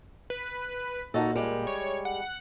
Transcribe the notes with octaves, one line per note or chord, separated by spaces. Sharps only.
B4
A#2 D#4 F#4 A4
G3 G#3
C#5
F#5